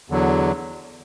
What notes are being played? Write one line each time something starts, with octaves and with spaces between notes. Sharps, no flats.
E2 D3 F#3